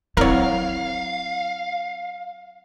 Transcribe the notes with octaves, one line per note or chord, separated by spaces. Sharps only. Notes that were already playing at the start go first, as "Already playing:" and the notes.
F#3 C4 E4 A#4 C#5 F5